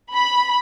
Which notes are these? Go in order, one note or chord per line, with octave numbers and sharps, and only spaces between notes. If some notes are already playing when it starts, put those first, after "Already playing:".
B5